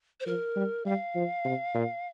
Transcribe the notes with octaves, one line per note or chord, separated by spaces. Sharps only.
C5
F3 A#4
G3
G3 F5
F3
C3
A#2